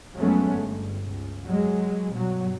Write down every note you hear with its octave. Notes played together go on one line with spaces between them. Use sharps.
F2 F#3 G#3 A3 B3 C#4
G1 G2
C#2
F#3 G#3
G2 B2 F#3